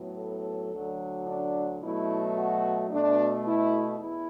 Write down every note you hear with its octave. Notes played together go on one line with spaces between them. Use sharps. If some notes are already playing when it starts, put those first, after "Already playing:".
Already playing: A2 F#3 B3
A4
D2 D3 F#3
D4
B2 F#3 A3 E4
F#4
B2 A3 D4
E4
E2 E4